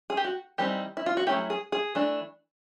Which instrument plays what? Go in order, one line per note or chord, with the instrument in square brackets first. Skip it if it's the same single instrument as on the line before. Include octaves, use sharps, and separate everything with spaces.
[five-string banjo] G#4
G4
F#4
E3 G3 C4 D#4 G4
E4
F4
F#4
F#3 A3 C#4 E4 G4
G#4
G#4
E3 A3 D4